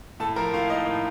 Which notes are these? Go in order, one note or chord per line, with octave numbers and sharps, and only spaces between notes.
A2 A4 A5
F3 A#4 A#5
A2 F4 F5
A#3 D#4 D#5
A2